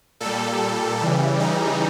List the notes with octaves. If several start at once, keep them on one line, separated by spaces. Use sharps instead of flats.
A#2 G3 A4
C#3 E3 G3
D#4